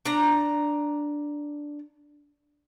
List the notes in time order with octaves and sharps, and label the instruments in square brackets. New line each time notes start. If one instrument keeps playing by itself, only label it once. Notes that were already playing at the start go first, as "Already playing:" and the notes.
[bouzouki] D4 A#5